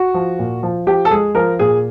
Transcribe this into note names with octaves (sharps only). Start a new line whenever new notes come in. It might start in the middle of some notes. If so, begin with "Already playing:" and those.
Already playing: F#4
F3
A#2
F3
F3 G4
A4
G#3 G#4
F3 A#4
A#2 G#4